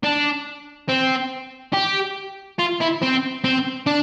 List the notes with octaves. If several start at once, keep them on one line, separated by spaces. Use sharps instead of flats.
D4
C4
G4
F4
E4
C4
C4
D4